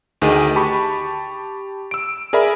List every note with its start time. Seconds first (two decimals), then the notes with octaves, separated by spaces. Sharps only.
0.22 D2 D#3 G#4 D#5 D#7
0.55 G4 A5 B5 C#6
1.91 E6 D7
2.33 G#4 A#4 D5 E5 B5